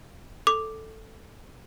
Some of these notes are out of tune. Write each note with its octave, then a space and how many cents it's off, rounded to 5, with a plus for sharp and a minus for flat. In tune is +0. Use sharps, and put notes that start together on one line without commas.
A4 +5 D6 +0